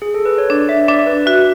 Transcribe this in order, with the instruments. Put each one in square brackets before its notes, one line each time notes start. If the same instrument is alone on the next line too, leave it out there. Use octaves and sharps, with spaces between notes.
[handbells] G#4
A4
B4
C#5
[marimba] D4 [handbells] D5
[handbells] E5
[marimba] D4 [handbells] D5
[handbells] B4
[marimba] F#4 [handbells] E5